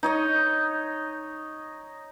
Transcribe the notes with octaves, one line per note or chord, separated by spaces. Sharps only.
D#4 C#5 D#5